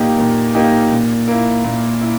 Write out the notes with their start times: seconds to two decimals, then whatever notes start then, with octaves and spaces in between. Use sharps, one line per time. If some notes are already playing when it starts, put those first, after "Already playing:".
Already playing: A#2 A#3 D#4 G4
0.18 A#2
0.55 A#3 D#4 G4
0.92 A#2
1.28 A#3 E4
1.64 A#2
2.01 E4